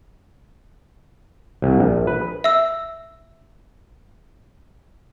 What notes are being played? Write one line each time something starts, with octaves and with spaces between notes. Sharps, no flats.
C2
A#1
B4
E5 E6